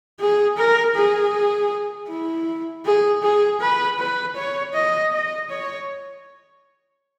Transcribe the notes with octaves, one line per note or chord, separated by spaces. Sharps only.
G#4
A#4
G#4
E4
G#4
G#4
B4
B4
C#5
D#5
D#5
C#5